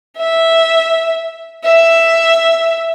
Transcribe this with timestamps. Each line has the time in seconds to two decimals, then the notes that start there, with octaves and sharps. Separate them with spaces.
0.17 E5
1.64 E5